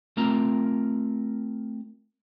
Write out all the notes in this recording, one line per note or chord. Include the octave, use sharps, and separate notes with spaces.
A3 C4 F4 A#4 A#5